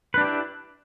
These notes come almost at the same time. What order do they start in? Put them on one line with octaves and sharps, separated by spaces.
B4 D4 G4 E4